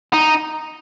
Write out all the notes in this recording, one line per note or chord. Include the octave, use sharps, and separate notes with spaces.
D#4